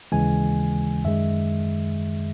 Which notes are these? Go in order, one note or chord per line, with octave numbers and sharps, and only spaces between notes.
D#2 C#3 E3 G#3 G#5
F#2 D#3 G#3 E5